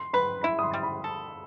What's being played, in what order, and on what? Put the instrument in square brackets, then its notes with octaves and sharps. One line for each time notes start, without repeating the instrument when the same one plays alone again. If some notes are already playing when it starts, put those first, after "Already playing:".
Already playing: [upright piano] C6
[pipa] B4 [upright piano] B5
[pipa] E4 [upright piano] B5
[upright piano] D#6
C6
[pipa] G3
[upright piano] B5
[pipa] A4